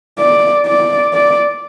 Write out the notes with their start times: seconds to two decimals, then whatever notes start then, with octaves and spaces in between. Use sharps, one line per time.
0.19 D5
0.67 D5
1.14 D5